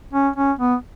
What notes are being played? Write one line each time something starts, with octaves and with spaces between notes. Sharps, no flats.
C#4
C#4
B3